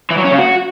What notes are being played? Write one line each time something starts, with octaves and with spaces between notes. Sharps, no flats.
E3
F#3
C#4
C#3
F#4